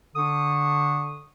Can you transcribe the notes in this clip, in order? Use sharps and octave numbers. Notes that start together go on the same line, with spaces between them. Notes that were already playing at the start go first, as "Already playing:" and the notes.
D3 D4 C#6 D#6